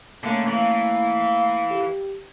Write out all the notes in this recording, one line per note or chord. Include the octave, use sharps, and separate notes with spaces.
D3 A3 A#3 C#4
E3 F5
G4